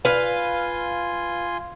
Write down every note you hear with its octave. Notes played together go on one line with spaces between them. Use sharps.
F4 B4 F5 G#5 C6